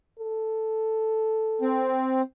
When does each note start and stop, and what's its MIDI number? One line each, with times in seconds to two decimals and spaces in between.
0.19 1.98 69
1.62 2.22 60